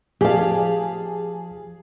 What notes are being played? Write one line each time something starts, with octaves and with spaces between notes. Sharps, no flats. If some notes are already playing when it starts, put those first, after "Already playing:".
F3 G4 G#4 F5 A5